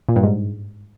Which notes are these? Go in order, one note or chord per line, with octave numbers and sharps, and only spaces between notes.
A#2
G2
G#2